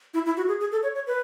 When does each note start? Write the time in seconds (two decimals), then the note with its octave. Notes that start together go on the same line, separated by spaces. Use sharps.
0.14 E4
0.26 E4
0.37 F#4
0.48 G#4
0.60 G#4
0.72 A4
0.83 C#5
0.95 C#5
1.07 B4